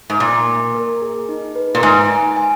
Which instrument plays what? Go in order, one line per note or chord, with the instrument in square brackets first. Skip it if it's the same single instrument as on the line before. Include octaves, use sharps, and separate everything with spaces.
[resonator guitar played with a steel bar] G#2
[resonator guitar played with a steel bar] A#2 [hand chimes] A#3
[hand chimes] A#3
A#4
G#4
D#4
B4
[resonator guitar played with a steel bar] A#2
[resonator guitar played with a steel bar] G#2 [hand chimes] G#5
[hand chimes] G#5
G#5